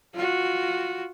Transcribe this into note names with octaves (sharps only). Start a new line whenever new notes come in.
F4 F#4